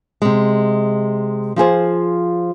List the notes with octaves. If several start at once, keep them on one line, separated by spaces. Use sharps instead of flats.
C3 G#3
F3 F4 G#4 C5